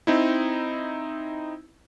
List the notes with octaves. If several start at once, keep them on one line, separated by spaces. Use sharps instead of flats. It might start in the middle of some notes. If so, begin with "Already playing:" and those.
C4 D#4 E4